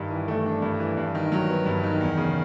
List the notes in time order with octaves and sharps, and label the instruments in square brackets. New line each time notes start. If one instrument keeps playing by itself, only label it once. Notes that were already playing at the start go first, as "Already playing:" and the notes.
Already playing: [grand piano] G2 D#3
E3
A3
D4
G2
E3
G2
D#3
F#3
B3
G2
D#3
E2
C#3